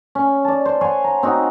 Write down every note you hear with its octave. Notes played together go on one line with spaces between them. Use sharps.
C#4
D5 A5
C5
C#5 F#5 G#5 C6
A#5
C4 D#4 F#4